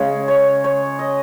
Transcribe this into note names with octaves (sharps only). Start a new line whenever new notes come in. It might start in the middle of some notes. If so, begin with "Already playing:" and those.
Already playing: C#3 G#3 C#5
C#5
C#5
D#5